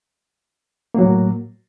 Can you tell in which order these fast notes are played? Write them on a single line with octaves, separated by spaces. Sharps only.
A#3 F#3 A2